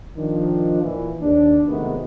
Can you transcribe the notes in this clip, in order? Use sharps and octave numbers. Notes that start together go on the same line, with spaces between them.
D#3 F3 D4
A#2 E3
D#2 D4
C3 D#3 G#3 A3 B3 F#4